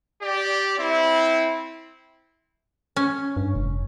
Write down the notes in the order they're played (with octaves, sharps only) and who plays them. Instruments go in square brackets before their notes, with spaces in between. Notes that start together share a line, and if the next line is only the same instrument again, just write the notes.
[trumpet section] G4 D5
C4 E4
[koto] C#4
[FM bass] G2
F1